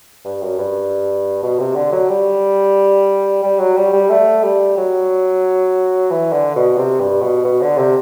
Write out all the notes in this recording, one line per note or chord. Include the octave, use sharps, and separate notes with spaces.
G2
F#2
G2
B2
C3
D3
F#3
G3
G3
F#3
G3
G3
A3
G3
F#3
E3
D3
B2
C3
G2
B2
B2
D3
C3